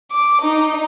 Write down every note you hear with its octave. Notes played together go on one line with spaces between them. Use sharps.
D6
D#4